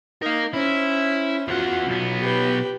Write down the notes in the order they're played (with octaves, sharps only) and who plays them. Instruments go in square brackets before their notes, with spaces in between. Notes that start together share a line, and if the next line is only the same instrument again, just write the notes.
[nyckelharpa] D#4 [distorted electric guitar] A#4 F5
[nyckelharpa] C#4 C5 [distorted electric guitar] E4
[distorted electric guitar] E2 F#5 [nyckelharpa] F4 F#4
[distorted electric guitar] B1 B3
[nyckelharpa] G4 B4